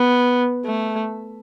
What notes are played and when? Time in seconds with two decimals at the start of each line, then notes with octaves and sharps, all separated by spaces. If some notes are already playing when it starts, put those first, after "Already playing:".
Already playing: B3
0.65 A3